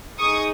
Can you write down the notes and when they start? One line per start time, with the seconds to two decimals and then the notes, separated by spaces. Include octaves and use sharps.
0.19 D#4 G#4 C#6 D#6